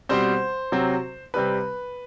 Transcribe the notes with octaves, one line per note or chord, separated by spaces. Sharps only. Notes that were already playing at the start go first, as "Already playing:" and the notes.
B2 G3 C4 C5
C3 F#3 C4
C3 G3 C4 B4